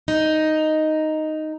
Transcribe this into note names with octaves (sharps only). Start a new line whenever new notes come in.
D#4